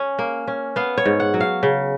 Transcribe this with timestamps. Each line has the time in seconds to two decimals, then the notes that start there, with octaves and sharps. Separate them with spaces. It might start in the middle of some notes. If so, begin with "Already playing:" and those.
Already playing: C#4
0.19 A#3
0.47 C#4
0.76 B3 F5
0.97 C#5
1.05 G#2
1.20 F#5
1.34 F#3
1.41 F5
1.63 C#3